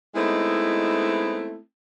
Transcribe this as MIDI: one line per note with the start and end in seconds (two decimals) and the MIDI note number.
0.15 1.59 56
0.15 1.59 57
0.15 1.59 59
0.15 1.59 60
0.15 1.59 63
0.15 1.59 64